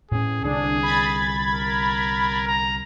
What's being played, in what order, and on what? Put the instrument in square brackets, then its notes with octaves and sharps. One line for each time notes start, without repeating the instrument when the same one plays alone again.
[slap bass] A2 C#4 [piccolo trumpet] G#4
[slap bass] C2 D3 [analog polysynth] D4 [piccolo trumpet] G#4
[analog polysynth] B5 G#6 A6
[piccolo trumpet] A#4
A#5